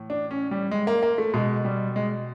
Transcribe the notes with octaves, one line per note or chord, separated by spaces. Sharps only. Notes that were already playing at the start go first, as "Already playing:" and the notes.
Already playing: A2 E3
D4
C#4
G3
G#3
A#3
A#3
A3
B2 G#3
G3
G#3